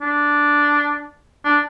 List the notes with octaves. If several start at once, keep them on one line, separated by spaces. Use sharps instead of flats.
D4
D4